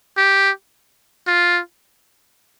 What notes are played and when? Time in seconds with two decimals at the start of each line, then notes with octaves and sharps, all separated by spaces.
0.17 G4
1.27 F4